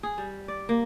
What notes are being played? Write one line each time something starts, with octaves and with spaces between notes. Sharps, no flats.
G#4
G3
D5
A#3